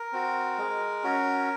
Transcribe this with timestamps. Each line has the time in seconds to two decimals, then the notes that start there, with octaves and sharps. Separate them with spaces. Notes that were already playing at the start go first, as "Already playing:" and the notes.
Already playing: A#4
0.13 C4 F#4
0.58 G#3
1.04 C#4 F#4